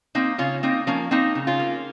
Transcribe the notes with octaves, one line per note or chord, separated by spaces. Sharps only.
A#3 C4 D#4
C#3 C#4 F4
A#3 C4 D#4
F3 A#3 C#4
A#3 C4 D#4
C#3
C#4 F4
A#3